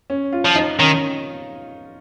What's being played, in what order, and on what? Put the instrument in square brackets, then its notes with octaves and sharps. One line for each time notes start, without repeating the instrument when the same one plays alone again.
[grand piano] C#4
F4
[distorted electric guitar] F3
[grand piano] D#4
[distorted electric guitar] D#3 [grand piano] C#4